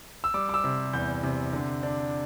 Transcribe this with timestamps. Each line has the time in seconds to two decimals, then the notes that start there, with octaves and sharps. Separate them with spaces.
0.24 E6
0.34 G3 D6
0.49 D6
0.54 E6
0.64 C3
0.93 E2 G6
1.23 C3
1.53 D3
1.83 D4